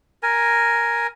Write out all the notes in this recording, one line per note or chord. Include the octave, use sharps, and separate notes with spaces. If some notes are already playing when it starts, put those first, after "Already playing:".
A#4 G#5